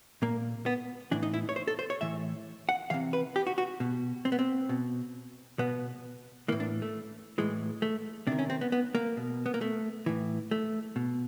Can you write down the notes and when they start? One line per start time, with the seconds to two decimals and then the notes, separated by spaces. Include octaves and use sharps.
0.22 A#2 A#3
0.66 B3
1.11 A2 E3 D4
1.23 D#4
1.34 E4
1.49 C#5
1.56 C5
1.67 A4
1.79 C5
1.90 C#5
2.01 A2 E3 E5
2.69 F#5
2.90 C3 E3 F5
3.13 B4
3.36 G4
3.47 F#4
3.58 F#4
3.80 B2
4.25 C4
4.32 B3
4.39 C4
4.69 B2
5.59 B2 B3
6.48 E3 A#3
6.52 A2
6.60 D4
6.82 A3
7.38 A2 E3 G#3
7.82 A3
8.27 C3 D4
8.32 D#3
8.39 C#4
8.50 C4
8.61 B3
8.72 B3
8.95 A#3
9.17 B2
9.46 B3
9.54 A#3
9.61 A3
10.06 A2 E3
10.51 A3
10.96 B2